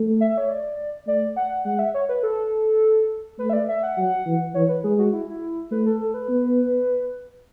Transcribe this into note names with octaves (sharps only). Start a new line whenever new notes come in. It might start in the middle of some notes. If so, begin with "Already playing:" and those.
Already playing: A3
E5
C#5
D5
A3 D5
F#5
G#3 F#5
F#5
E5
C#5
B4
A4
A3 B4
E5
D5
E5
F#5
F#3 F#5
E3
E3 C#5
B4
G#3 G#4
F#4
E4
E4
A3 B4
A4
A4
B4
B3